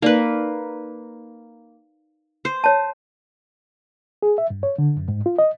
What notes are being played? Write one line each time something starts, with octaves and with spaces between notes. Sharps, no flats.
A#3 D#4 B4 D5
C5
C#5 A5
G#4
E5
G2
C#5
D3
F#2
G#2
F4
D#5